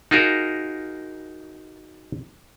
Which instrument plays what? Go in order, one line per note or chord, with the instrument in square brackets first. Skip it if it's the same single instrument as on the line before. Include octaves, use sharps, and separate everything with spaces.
[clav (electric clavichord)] D#4 F4 F#4 G#4 A#4